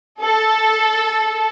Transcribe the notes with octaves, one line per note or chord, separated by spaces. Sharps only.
A4